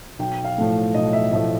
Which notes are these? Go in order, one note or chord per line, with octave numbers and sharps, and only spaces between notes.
B1 G5
F5
A2 F3 A3
B1 D#5
E5
A2 F3 A3 E5